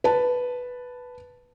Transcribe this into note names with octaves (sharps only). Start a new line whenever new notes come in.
B4 A5